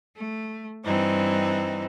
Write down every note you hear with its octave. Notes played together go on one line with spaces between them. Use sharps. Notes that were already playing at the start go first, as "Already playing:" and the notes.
A3
G2 E3 C4 D#4